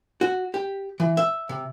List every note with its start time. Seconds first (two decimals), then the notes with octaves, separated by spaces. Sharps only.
0.21 F#4
0.54 G4
1.00 E3
1.17 E5
1.49 C3